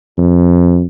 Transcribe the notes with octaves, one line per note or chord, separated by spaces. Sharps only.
F2